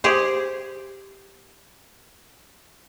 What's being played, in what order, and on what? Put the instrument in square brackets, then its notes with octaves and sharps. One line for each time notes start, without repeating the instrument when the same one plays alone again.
[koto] G4 G#4 C5